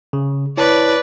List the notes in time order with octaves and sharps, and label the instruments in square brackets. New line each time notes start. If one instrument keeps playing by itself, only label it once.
[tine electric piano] C#3
[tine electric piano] E4 C#5 A5 [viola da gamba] B4 D5